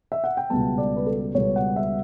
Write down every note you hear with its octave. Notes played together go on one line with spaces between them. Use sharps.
E5
F#5
G5
C#2 B2 G3 B3 A5
D5
B4
A4
C#2 B2 G3 B3 C#5
F#5
E5